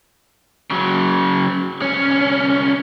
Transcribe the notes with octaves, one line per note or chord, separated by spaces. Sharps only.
C#3 F#3
C2 C#4